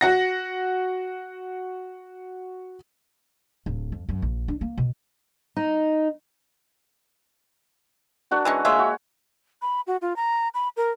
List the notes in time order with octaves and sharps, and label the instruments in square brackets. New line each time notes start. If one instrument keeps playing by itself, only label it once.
[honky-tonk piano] F#4 F#5 A#6
[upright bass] D1
F2
F#2
A#1
D4
A#3
B2
[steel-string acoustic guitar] D#4
[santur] D4 F#4 A#4
[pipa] E3 G#3 C#4
[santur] G#3 A#3 C#5 [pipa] F4 E5
[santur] F#4
[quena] B5
F#4
F4
A#5
B5
A#4